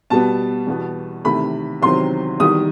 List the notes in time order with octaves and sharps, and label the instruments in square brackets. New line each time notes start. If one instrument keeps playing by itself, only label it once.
[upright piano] B2 G3 B3 A5
E2 B2 G3 B3
E2 C3 D#3 A3 B5
E2 C3 D#3 F#3 C4 C6
E2 D#3 G3 D#6